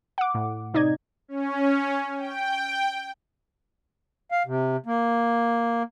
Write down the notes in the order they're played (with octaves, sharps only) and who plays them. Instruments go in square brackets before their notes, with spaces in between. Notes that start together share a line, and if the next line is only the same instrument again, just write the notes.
[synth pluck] F#5 D6
A2
C3 D#4 D5 D#5 G#6
[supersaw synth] C#4
G5
[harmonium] F5
C3
A#3